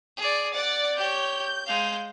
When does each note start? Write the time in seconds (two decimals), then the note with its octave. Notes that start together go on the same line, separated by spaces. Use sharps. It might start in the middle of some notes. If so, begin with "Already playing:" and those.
0.17 G#4 D5
0.54 D5 F#5 A6
0.97 G4 C#5 G6
1.66 G#3 F5